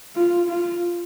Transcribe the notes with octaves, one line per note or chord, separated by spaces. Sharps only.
F4
F4